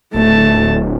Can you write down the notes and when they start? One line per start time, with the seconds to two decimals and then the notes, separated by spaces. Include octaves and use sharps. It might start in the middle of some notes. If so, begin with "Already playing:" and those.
0.14 D1 A3 A5